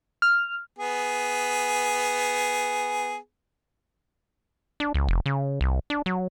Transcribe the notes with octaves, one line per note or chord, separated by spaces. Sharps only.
F6
B3 G#4
D4
C#2
F1
C#3
C2
D4
F#3